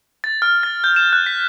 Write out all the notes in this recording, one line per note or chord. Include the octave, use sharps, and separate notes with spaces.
A6
F6
A6
G6
E7
F#6
B6